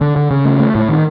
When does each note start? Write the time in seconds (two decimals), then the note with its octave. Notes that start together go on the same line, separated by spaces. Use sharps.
0.01 D3
0.16 D3
0.31 C#3
0.45 A3
0.60 A3
0.75 A2
0.89 D#3